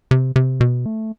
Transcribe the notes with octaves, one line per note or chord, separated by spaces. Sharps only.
C3
C3
B2
A3